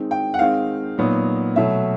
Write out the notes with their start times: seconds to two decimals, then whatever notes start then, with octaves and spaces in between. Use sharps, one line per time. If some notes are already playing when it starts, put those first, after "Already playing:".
Already playing: D#3 G#3 C4 D#4
0.11 G5
0.34 F#5
0.39 D#3 G#3 C4 D#4 F5
0.98 A#2 F#3 B3 D#4
1.56 B2 F#3 A3 E5